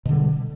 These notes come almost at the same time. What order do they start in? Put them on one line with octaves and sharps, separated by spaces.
B2 D3 G3